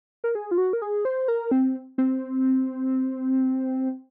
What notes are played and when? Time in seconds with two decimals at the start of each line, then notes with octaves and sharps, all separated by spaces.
0.24 A#4
0.35 G#4
0.51 F4
0.58 F#4
0.73 A#4
0.82 G#4
1.05 C5
1.28 A#4
1.51 C4
1.98 C4